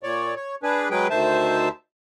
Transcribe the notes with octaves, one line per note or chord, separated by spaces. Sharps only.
A#2 C#5 D5
C#5
D4 G#4 B4
F#3 G#3 G#4 B4 G5
D2 D#3 C5 E5 A5